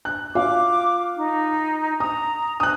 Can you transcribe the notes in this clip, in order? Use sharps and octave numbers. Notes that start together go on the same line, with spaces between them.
F#6
F4 F5 D6
D#4
A#5 D#6
D#6 F#6